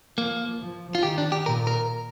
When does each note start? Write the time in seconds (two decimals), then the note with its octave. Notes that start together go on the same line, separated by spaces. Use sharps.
0.17 F3 A#3
0.60 F3
0.95 F4
1.03 D#3 G4
1.18 D4
1.32 G4
1.46 A#2 A#4
1.67 A#4